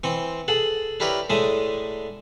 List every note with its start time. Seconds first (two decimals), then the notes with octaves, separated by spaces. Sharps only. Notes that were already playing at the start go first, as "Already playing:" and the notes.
0.04 E3 C4 C#6
0.48 G#4 A4 F#5
1.00 D4 E4 G4 A#4 B4 C#5
1.30 A2 G#3 D4 E5 D#6